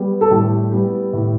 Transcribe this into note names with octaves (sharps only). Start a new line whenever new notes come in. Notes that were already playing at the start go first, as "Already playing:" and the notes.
Already playing: G3 B3
A4
A2 G3 G4
G3 B3
A2